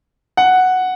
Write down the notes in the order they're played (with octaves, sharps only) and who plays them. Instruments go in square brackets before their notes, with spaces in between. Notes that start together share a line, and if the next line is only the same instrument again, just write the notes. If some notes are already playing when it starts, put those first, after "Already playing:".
[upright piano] F#5